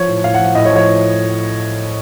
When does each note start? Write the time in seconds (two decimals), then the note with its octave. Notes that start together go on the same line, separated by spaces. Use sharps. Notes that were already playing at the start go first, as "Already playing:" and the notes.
Already playing: F3 C#5
0.08 A2
0.24 A2 F5
0.34 F3 F#5
0.44 F5
0.55 A2 D#5
0.65 C#5
0.71 F3
0.76 C#5
0.86 A2